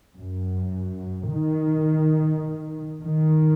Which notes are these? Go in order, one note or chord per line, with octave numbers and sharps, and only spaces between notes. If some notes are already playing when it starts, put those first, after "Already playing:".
F#2
D#3
D#3